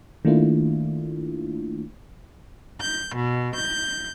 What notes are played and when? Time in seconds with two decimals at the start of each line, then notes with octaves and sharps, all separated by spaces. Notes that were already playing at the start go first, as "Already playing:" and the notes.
0.25 D#3 A3 A#3 D4 E4 F4
2.81 G6
3.16 B2
3.55 G6